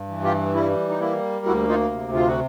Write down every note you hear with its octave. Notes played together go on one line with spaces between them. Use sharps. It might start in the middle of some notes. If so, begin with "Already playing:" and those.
Already playing: G2
E3
F4 G4
G3 E4
D#4
A#3 E4
D2 E4 F#4
D#4 F4
C3
F4
F#4